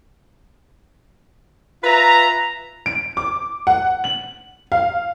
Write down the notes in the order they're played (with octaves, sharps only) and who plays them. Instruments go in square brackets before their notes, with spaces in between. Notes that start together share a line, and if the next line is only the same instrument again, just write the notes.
[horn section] F4 B4 E5 A#5
[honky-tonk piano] D7
D6
F#5
F#7
F5